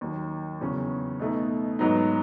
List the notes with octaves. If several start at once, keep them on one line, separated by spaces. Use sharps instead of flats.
D#2 D#3 F#3
E2 C#3 F#3 C#4
B2 A3 D#4
G#2 F#3 B3 D#4